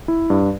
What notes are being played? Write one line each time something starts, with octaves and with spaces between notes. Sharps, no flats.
E4
G2